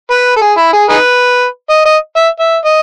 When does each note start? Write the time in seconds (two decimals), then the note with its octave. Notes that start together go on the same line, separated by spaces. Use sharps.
0.10 B4
0.36 A4
0.41 G#4
0.57 E4
0.73 G#4
0.89 D#4 G#4 B4
1.69 D#5
1.85 D#5
2.16 E5
2.40 E5
2.65 D#5